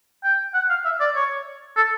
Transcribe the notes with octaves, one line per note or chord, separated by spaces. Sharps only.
G5
F#5
F5
E5
D5
C#5
A4